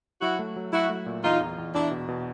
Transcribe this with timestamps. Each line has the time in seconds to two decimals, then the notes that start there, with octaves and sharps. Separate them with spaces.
0.21 F#3 E4 F#4
0.39 A3
0.56 F#3
0.73 F#3 E4 F#4
0.90 A3
1.06 A#2
1.23 E2 D#4 F4
1.40 E2
1.58 E2
1.74 E2 D4 E4
1.91 B2
2.08 B2